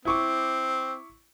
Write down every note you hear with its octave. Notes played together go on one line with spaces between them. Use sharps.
C4 E4 C#6 D6